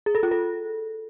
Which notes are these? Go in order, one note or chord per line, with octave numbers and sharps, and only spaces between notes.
G#4
A4
F4
A4